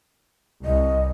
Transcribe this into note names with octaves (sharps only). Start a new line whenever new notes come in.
C2 D#5